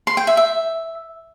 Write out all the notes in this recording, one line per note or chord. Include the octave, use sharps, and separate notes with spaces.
C6
G5
E5
E5